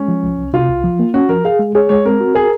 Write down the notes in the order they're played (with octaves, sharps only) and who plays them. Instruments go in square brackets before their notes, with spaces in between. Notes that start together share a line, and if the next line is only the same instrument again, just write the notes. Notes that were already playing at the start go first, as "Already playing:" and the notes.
Already playing: [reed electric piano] G#3 [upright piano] C#4
[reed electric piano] F3
C2
C2
[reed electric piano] C3 [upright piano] F4
[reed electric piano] C2
F3
A#3
[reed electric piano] C#4 [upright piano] F#4
[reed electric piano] F3 [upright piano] A#4
[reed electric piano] G#4 [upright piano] F5
[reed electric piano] G#3
[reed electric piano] G#4 [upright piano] C#5
[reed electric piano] G#3 [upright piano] C#5
[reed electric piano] C4 [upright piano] A#4
[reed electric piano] F#4
[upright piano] G#4 [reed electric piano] A#4